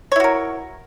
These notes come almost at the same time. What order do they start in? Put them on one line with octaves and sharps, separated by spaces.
C#5 E4 F#4 A#4